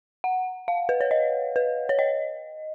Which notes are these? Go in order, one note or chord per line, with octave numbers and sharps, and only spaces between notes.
F#5
F5
B4
C#5
D#5
B4
C#5
D#5